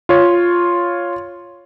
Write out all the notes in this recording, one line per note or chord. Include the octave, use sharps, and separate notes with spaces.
F4 C#5